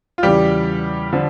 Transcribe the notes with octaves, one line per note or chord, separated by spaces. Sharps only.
F4
E2 C#3 E3 G3 G4
D3 F3